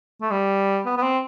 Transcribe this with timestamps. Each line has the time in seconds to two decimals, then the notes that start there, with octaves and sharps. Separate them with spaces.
0.21 A3
0.31 G3
0.86 B3
0.97 B3
1.02 C4